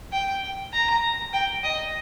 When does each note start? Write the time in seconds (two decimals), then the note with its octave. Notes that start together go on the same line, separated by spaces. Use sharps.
0.12 G5
0.72 A#5
1.33 G5
1.63 D#5